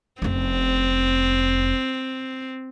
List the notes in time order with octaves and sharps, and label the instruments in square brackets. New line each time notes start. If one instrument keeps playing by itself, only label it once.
[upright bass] F1 C#4 [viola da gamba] C4